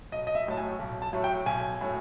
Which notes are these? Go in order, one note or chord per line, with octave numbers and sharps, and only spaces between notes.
B1 D#5
D#5
E5
A2 F#3 A3 A5
G#5
B1
A5
A2 F#3 A3
G5
B1 G#5
A2 F#3 A3